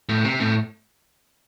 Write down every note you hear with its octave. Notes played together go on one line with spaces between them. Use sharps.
A2
C3
A2